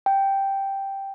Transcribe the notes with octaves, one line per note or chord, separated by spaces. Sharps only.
G5